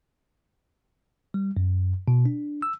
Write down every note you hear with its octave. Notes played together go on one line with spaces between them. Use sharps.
G3
F#2
B2
D4
E6